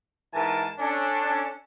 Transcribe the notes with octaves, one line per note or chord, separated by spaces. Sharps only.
G#2 E3 A#4 G#5 A5
C#4 D4 A4